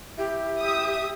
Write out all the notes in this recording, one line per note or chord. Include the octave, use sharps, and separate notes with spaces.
E4 G4
E5 D#6